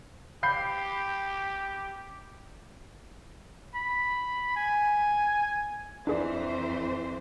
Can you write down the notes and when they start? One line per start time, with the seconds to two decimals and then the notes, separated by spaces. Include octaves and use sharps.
0.43 G4 B5 G6 C7
3.75 B5
4.56 G#5
6.07 F2 E3 D4 G#4 C5 D5